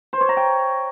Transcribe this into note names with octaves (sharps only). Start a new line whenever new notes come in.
C5
C#5
A#5
G5